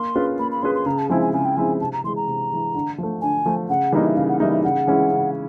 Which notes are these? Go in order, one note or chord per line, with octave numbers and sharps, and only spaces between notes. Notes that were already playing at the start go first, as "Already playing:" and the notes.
Already playing: A#3 C6
C#4 F4 G#4 B4
A#3 B5
B5
C#4 F4 G#4 B4 C6
C6
C#3 A#5
A5
F3 G#3 C4 E4 G#5
G#5
C#3 G#5
G5
F3 G#3 C4 E4 G#5
C3 A5
A#5
E3 G#3 C6
A#5
C3
E3 G#3
D3
F3 A3
D3 G#5
F3 A3
C#3 F#5
E3 G3 A#3 D#4 D#5
E5
C#3 F5
F#5
E3 G3 A#3 D#4 E5
E5
C#3 F#5
E3 G#3 C#4 E4
C#3